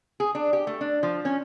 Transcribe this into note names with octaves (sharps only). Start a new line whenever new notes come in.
G#4
D4
G4
A3
D4
F3
C#4